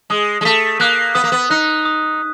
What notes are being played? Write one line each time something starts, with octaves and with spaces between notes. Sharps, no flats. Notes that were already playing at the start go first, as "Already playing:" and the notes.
G#3 D#6
G#3
A3 B6
A#3 F#6
B3 D#6
A#3
B3
D#4 F#6
D#6